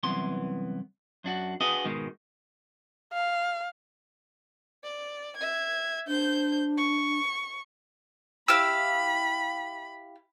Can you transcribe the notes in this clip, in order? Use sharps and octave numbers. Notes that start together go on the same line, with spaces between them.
C2 F#2 E3 B3 C6
F#2 D4 F#4
D4 F#4 G#4 B4 D#5
G#2 B2 D#3 G#3
F5
D5
E5 G#6
D4 C5 G6
C#6
E4 G4 F5 B5 E6